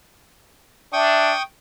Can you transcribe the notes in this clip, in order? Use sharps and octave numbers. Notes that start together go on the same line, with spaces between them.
D4 E5 G5 C#6 D#6